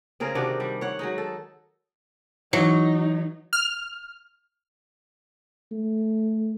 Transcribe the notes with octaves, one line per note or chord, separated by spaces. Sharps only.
C#3 C4 G#4 A#4
C3 D#3 D4 F#4
G3
C#5 F#5
F#3 G#3 D#4
A4
E3 F#3 D#4
F6
A3